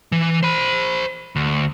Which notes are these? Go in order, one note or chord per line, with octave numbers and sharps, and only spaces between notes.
E3
C5 B5
D2